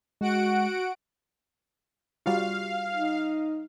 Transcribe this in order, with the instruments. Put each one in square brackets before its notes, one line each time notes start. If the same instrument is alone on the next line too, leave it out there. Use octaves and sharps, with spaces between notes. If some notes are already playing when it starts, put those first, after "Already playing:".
[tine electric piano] G#3 [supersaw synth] F#4 F#5 D7
[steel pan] G3 F4 F#4 [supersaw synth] F5
[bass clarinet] D#4